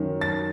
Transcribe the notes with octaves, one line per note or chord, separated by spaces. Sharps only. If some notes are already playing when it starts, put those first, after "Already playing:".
Already playing: F#2 D#3
A6